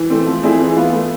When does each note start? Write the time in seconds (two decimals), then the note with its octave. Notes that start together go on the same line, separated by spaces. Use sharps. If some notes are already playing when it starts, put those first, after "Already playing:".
Already playing: E3
0.10 A3 C4
0.26 F3
0.43 A3 C4 E4 G#4
0.59 E3
0.77 B3 F4
0.93 A3